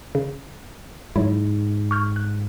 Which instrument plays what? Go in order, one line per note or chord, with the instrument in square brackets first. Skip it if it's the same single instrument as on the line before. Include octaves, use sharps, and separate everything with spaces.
[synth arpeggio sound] C#3
[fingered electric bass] G#2 [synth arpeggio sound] F#3 E4
[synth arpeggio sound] C#6 F6 G6
F#6